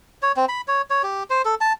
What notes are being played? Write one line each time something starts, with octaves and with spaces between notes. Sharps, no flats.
C#5
C4
B5
C#5
C#5
G4
C5
A4
A5